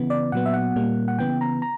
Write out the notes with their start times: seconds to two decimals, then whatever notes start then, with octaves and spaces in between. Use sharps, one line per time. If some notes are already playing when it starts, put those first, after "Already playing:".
Already playing: C#3 E3 B3
0.10 D5
0.32 A#2 F#3 B3 F#5
0.46 E5
0.54 F#5
0.76 A#2 G3 A#3
1.08 F#5
1.19 C#3 E3 B3 G5
1.41 A#5
1.62 A#5